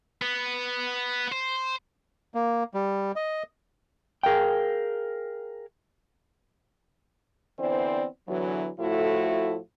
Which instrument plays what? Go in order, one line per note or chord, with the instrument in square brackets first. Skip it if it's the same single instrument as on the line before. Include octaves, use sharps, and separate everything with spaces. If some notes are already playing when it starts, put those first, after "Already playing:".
[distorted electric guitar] B3
C5
[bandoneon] A#3
G3
D#5
[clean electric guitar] G#4 A#4 F5 G5
[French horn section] D3 E3 B3 C4 C5 D5
E2 D3 E3 F#3
A2 F3 A3 E4 F#4 A4